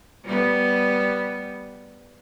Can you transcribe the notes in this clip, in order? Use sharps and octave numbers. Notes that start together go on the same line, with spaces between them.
G3 B3